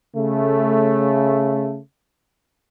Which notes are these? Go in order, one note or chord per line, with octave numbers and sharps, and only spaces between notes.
C#3 A3